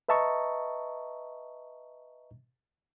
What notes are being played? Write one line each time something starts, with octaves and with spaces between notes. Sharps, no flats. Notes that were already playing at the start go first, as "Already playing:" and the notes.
B4 D#5 E5 A5 A#5 C#6